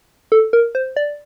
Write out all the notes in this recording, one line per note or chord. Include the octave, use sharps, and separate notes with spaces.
A4
A#4
C5
D5